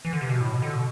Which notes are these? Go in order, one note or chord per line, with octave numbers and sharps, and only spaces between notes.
E3
D3
C3
B2
A2
B2
D3
B2